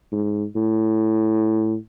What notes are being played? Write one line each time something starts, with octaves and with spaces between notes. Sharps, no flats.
G#2
A2